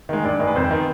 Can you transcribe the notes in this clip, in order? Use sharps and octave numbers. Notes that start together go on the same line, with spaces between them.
D#3 G#3
G2 D5
D#3 G#3
B4
F2 C5
D#3 B3